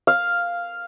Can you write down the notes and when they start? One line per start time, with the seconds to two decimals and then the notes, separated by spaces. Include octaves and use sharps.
0.07 F5